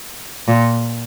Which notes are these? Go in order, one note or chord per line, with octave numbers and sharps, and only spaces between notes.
A#2